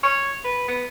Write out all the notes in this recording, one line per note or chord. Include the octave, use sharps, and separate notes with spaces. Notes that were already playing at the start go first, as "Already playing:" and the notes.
C#5
B4
B3